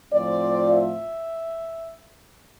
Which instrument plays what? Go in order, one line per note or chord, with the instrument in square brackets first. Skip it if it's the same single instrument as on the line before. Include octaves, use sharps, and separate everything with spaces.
[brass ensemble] A2 F3 C4 F4 D5
E5